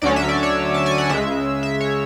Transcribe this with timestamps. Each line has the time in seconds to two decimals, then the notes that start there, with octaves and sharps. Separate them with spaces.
0.02 D2 D3 F#3 C#4 D5
0.16 E5
0.29 D5
0.43 C#5
0.74 A5
0.86 G#5
0.98 F#5
1.09 C#2 C#3 G#3 E5
1.63 E5
1.80 C#5